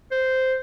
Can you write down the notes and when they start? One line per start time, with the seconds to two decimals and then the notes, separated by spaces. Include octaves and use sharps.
0.11 C5